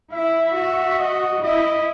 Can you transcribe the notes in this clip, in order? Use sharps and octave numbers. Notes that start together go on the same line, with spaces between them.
E4 E5
F#4
D#5
E4 D#5